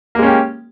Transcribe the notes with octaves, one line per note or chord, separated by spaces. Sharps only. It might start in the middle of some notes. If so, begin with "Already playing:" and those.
G#3 A#3 C#4 G4